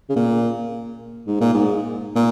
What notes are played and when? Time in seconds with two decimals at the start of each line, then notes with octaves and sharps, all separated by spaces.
0.09 C#3
0.16 A#2
1.27 G#2
1.41 A#2
1.54 G#2
2.15 A#2